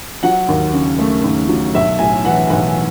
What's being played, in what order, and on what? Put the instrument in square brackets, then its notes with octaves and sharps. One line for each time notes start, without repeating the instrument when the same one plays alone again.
[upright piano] F#3 F#5
D#2
C#3
A3
D#2
F#3
B1 E5
A2 G#5
E3 F#5
B1 F#5